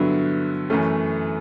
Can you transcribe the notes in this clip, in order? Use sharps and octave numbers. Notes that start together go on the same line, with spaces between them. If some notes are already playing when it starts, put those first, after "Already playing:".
Already playing: G2 D3 F#3 B3 E4
F#2 E3 A3 C#4